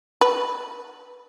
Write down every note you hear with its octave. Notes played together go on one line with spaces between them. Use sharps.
B4